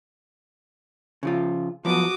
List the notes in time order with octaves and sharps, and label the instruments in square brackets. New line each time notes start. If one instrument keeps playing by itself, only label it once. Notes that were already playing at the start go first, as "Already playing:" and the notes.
[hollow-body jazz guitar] C#3 F3 F4
[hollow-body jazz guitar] F3 F#3 B3 [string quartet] F#4 D6 D#6